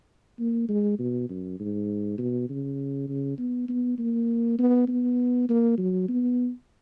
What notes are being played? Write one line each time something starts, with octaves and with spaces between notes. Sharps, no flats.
A#3
G#3
B2
F#2
G#2
B2
C#3
C#3
B3
B3
A#3
B3
B3
A#3
F#3
B3